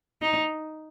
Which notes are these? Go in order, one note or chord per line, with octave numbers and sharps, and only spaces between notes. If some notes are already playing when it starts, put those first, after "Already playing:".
D#4